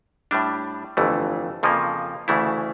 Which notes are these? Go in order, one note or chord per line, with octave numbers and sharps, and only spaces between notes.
A2 G3 D4
G1 F2 E3 A3
F2 C#3 F3 A#3
D2 C#3 E3 A3 E4